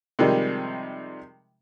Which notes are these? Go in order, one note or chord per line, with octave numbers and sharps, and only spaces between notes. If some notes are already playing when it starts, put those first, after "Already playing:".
C3 D#3 F3 G3 G#3